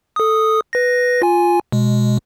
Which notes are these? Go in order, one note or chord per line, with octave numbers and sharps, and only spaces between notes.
A4 D#6
B4 A#6
F4 G#5
B2 G#3